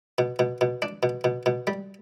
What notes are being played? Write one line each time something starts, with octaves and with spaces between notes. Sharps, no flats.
B2
B2
B2
D4
B2
B2
B2
G3